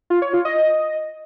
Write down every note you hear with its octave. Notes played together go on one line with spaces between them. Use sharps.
F4
C#5
F4
D#5